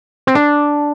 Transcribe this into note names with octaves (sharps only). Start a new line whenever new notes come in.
C4
D4